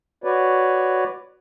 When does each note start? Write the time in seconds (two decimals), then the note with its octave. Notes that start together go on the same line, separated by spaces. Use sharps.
0.24 F#4 B4 C#5 D5